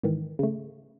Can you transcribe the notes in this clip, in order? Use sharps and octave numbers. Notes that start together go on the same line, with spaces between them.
G#2 D#3 E3
C#3 A3